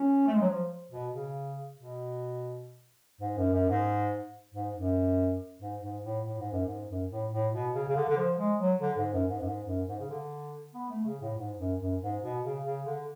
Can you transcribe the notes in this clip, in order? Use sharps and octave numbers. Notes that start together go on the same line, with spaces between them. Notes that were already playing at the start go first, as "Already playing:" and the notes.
Already playing: C#4
A3
G#3
F#3
F3
B2
C#3
B2
G#2
F#2
F#2
G#2
G#2
F#2
G#2
G#2
A2
A2
G#2
F#2
G#2
F#2
A2
A2
B2
C#3
C#3
D3
D3
F3
G#3
F#3
D3
G#2
F#2
G#2
F#2
G#2
F#2
G#2
C#3
D3
B3
A3
C#3
A2
G#2
F#2
F#2
G#2
B2
C#3
C#3
D3